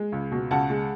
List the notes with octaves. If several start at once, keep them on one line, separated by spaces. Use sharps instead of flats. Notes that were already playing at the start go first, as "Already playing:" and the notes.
Already playing: G#3
C#2
B2
C#2 F#5 A5
G#3